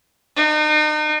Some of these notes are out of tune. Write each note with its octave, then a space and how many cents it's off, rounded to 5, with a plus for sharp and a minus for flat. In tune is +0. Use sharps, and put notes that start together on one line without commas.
D#4 -40